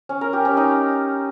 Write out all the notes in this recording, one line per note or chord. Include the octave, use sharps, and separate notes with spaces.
C#4
A#4
G4
C#4
D#4